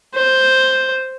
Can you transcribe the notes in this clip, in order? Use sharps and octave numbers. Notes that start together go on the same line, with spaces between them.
C5